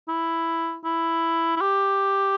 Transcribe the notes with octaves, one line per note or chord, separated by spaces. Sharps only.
E4
E4
E4
G4